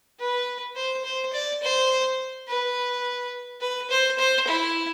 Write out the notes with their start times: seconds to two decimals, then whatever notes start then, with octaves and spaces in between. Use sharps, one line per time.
0.19 B4
0.76 C5
1.04 C5
1.33 D5
1.62 C5
2.47 B4
3.61 B4
3.90 C5
4.18 C5
4.47 E4